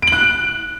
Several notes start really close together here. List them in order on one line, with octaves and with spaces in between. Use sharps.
D7 F#7 F#6